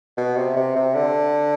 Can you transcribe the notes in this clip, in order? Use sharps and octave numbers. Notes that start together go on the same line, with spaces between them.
B2
C3
C3
C3
D3